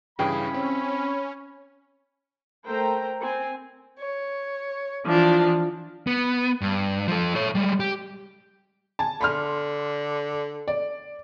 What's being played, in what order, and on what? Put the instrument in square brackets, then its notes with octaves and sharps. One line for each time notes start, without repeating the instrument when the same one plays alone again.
[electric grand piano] G2 C#3 E3 [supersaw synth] C#4 [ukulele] E4 G#4 G5 [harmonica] B5
[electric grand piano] C4
[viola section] A3 A#4 C5 G5 A#5
C4 G#5
[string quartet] C#5
E3 F3 D4
[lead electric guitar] B3
G2
F3 A4
A4 C#5
G3 G#3
G4
[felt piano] G#5 A5
[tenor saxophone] D3 [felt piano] B5 C6 F6
[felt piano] D5